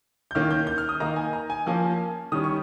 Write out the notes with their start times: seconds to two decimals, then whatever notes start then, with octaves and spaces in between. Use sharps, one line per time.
0.31 G6
0.35 D#3 A#3 C#4 F6
0.51 G6
0.67 G6
0.78 F6
0.89 D#6
1.00 D#3 A#3 D#4 A#5
1.16 G#5
1.33 A#5
1.50 G#5
1.66 F3 A#3 C#4 G#5
2.32 D#3 G3 C#4 D#6
2.44 C#6